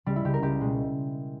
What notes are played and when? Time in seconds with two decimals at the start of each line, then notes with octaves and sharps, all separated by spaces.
0.06 C#2 G3
0.16 E4
0.25 C#2 G4
0.34 A#4
0.42 C#2 G4
0.60 B2 G#3